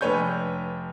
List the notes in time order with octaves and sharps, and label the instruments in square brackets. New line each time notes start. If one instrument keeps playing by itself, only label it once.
[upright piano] F1 D4 B4 C#5 G#5 G6